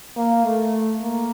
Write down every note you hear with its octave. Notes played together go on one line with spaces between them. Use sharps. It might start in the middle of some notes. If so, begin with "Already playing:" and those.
A#3
A3
A#3